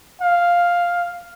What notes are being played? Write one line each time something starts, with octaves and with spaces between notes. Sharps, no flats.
F5